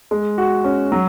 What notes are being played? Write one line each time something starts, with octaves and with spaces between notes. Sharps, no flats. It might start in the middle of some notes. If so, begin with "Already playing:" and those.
G#3
F#4
C#4
F#3